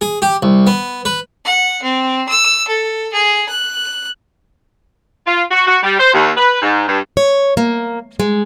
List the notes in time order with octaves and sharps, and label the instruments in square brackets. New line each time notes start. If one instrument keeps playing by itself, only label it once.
[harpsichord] G#4
G4
C2
B3
B4
[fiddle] F#5
C4
E6
A4
G#4
F#6
[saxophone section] F4
F#4
F#4
G3
C5
D#2
B4
G#2
G2
[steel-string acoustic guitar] C#5
A#3
G#3